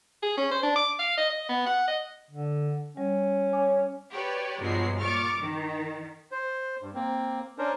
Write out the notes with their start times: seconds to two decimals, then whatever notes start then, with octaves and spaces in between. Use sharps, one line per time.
0.22 G#4
0.37 C#4
0.51 C5
0.63 D4
0.76 D6
0.99 F5
1.17 D#5
1.30 D#5
1.49 B3
1.66 F#5
1.87 D#5
2.31 D3
2.97 G3 C#4
3.53 C#5 G#5 D6
4.12 G4 B4 C#5 D5
4.60 G2 B2 F3 F#3 G#3 C7
5.00 A#2 C#6 D6 F6 A6
5.38 D#3
6.32 C5
6.82 G2
6.94 A#3 C4
7.58 C#4 D4 A#4 C5